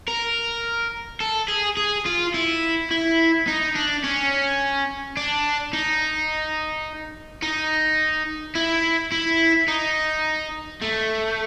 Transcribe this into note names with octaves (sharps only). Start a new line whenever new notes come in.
A#4
A4
G#4
G#4
F4
E4
E4
D#4
D4
C#4
D4
D#4
D#4
E4
E4
D#4
A3